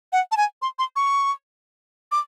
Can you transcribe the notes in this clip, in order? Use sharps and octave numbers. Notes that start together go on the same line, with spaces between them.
F#5
A5
G#5
C6
C6
C#6
D6